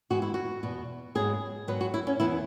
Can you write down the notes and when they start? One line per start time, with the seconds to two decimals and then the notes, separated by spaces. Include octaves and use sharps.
0.10 G#2 E3 G#3 B3 F#4
0.22 E4
0.34 F#4
0.63 E2 B2 B3
1.15 G#2 F#3 B3 G#4
1.68 G#2 F#3 B3 B4
1.81 F#4
1.94 E4
2.07 C#4
2.20 E2 E3 B3 E4